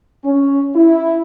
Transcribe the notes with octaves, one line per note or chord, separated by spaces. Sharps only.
C#4
E4